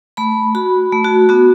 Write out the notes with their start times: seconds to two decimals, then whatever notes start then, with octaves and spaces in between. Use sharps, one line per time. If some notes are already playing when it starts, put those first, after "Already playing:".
0.17 A3 B5
0.55 F#4 B5
0.92 A3
1.04 F#4
1.29 B3 F#4